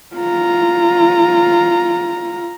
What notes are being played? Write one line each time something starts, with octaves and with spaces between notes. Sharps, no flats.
F4 A#5